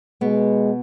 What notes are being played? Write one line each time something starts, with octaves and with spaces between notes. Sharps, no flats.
B2 G#3 B3